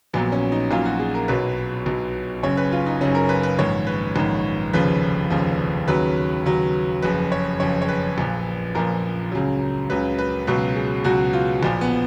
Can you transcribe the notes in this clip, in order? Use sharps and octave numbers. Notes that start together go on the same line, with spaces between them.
A#1 A#2 F#3 B3
C#4
D#4
A#1 A#2 F#3 F4
F#4
G#4
A#4
B1 B2 F#3 B4
B1 B2 F#3
F#1 F#2 C#3 C#5
B4
F4
D#4
F#1 F#2 C#3 C#4
A#4
B4
B4
A#1 G#2 D#3 C#5
B4
A#1 G#2 D#3
F1 D#2 C#3 F3 B4
F1 D#2 C#3 F3
D#2 C#3 F#3 B4
D#2 C#3 F#3
F#1 F2 C#3 B4
C#5
F#1 F2 C#3 C#5
C#5
B4
A#1 A#2 F3
A#1 A#2 F3 A#4
C#2 C#3 F#3
C#2 C#3 F#3 B4
B4
C#2 B2 F#3 B4
G#4
C#2 B2 F#3 F#4
F4
A#1 A#2 F3
B3